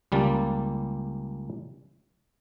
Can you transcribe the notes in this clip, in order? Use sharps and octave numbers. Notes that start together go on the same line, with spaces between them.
C#2 G3 A#3 A5